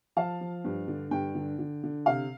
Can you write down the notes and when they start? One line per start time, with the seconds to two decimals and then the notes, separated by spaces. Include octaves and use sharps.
0.16 F3 F5 A5
0.41 F3
0.65 G2
0.88 D3
1.11 G2 G5
1.35 D3
1.59 D3
1.84 D3
2.06 C3 F5